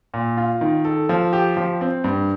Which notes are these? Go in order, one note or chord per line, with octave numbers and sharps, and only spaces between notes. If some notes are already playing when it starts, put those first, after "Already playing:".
A#2
F4
D#3
A4
F3
G4
F3
C4
G2